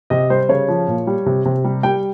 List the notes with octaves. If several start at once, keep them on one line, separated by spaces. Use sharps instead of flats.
C3 D#5
G3 C5
C#3 C#5
F3
A#2
G3
C3
C3
G3
G3 G5